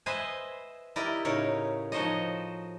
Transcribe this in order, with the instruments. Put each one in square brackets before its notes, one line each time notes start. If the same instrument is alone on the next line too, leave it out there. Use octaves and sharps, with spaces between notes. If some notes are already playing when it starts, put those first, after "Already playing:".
[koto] B4 C5 D#5 E5 G#5
E4 G4 A#4 D5 D#5
A2 C#3 D#4 A#4 C#5
F3 D#4 F#4 C5 C#5 D#5